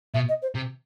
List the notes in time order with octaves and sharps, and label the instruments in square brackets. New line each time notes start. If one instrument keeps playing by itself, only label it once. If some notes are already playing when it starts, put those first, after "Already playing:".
[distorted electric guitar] B2 [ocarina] E5
[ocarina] D#5
C5
[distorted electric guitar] C3